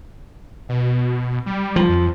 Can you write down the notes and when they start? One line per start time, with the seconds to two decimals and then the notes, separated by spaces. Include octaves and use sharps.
0.69 B2
1.46 G3
1.76 F3
1.89 F2